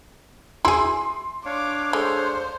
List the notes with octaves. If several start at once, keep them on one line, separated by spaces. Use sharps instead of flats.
E4 G#4 C6
D4 C#5 F5 D6
G#3 A3 C5